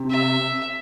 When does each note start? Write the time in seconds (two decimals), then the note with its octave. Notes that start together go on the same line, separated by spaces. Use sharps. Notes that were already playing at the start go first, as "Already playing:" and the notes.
Already playing: C3
0.10 E5